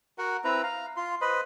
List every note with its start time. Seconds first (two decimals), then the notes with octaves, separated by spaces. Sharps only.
0.18 F#4 A#4 F#5
0.44 C4 E4 B4 A#5
0.63 F5 A#5
0.97 F4 C6
1.21 B4 C5 D#5 B5